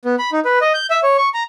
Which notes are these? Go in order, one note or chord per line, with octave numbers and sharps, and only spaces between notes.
B3
B5
D#4
B4
D#5
G6
E5
C#5
C#6
A#5